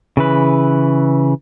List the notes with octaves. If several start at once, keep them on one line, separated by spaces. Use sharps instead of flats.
C#3 E3 B4